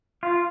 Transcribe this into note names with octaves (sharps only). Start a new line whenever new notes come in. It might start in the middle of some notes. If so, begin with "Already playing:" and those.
F4